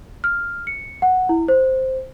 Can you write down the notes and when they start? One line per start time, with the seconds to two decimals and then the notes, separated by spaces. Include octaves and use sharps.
0.24 F6
0.67 C#7
1.02 F#5
1.29 E4
1.48 C5